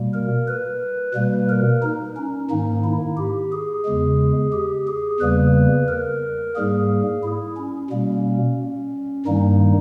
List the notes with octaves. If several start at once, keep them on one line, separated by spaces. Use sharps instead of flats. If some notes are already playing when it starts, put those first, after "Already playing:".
Already playing: B2 G3 A#3
A#4
B4
B2 G3 A#3 B4
A#4
D#4
C#4
G#2 D#3 A#3 D#4
E4
G4
G#4
E2 C#3 G#3
G4
G#4
E2 C#3 G3 A#3 B4
A#4
G#2 G3 A#3 G#4
E4
C#4
B2 G3 A#3
G2 D#3 G3 A#3 D#4